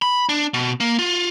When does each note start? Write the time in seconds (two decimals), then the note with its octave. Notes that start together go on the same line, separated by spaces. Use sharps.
0.02 B5
0.29 D4
0.54 B2
0.80 A#3
0.99 F4